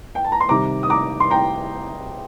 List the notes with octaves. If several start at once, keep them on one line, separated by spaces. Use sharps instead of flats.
G5
A5
A#5
C6
C3 D#3 G3 C4 A#5 D6
D#6
A#5 D6
C6
G5 A#5